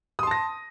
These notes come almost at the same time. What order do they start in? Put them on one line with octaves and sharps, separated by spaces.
D#6 C6 A5 A#6